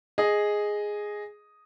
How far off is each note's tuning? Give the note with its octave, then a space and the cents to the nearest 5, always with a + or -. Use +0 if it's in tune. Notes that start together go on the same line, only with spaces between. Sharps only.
G#4 +0 D#5 +0